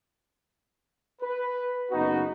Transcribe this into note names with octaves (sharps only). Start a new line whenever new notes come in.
B4
F#1 B3 D#4 F#4